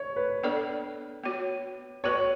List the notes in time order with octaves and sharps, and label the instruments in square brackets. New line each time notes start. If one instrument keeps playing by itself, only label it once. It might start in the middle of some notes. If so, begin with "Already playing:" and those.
Already playing: [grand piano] C#5
B4
[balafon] B3 D4 A4 D5
B3 F#4 C#5
[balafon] B3 F#4 B4 D5 [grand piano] C#5